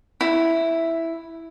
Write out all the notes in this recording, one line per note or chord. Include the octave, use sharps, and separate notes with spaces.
E4